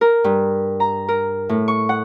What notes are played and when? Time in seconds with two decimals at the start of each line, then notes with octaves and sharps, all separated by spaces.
0.01 A#4
0.24 G2
0.80 A#5
1.08 A#4
1.49 A2
1.68 C#6
1.89 F#5